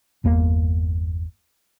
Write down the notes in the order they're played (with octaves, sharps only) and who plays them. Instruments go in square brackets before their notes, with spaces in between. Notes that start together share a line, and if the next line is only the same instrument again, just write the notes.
[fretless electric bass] G1 E2 A#3